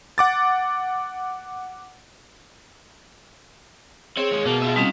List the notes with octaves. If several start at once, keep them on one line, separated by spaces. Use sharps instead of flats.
F#5 D6 A6
C4 G#4 C#5
D#2 G#3
B2 A#3
F4 E5
G3 C4 C#4 D#4 F4